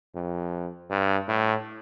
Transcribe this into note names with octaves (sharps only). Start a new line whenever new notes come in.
F2
G2
A2